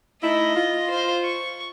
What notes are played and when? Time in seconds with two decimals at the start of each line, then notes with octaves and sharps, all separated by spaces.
0.23 A3 D#4 E4 D#5
0.56 F4
0.90 C5
1.24 C#6